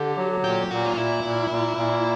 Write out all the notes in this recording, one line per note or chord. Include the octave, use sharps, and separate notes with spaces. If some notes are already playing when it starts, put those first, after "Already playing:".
Already playing: D3 G4
F#3
A#2 G4
A#2 F#4
F4
A#2 E4
A#2
A#2
A#2